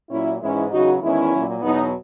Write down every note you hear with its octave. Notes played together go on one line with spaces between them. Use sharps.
A#2 F#3 C#4 E4
G#2 E3 G#3 C#4 E4
E2 C#3 F#3 D#4 F#4
E2 D#3 G#3 C#4 E4
A#2 F#3
E2 B2 F#3 B3 D#4